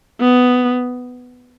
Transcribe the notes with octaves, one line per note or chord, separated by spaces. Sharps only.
B3